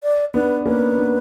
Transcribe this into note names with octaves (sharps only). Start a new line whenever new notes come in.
D5
B3 D4 B4
A#3 C#4 B4
B3 D4